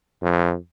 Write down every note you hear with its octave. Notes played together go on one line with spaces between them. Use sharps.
F2